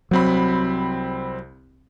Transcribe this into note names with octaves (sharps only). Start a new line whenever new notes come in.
C2 F#3 C4 B5